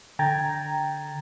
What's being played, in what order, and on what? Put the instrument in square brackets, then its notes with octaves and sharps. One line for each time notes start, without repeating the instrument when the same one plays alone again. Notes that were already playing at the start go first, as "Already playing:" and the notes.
[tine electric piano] D3 G#6 A6 [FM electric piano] G5 A#5